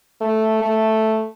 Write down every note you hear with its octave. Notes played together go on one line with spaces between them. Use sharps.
A3
A3